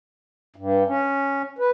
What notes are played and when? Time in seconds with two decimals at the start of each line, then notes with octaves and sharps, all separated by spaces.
0.56 G2
0.87 C#4
1.59 B4